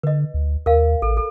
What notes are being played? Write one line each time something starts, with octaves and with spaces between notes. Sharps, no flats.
D3 B4 D#5
D2
D#2 A#4 F5
A1 A4
A4